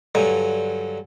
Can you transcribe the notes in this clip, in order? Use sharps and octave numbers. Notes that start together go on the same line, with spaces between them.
G2 D3 F#3 G#5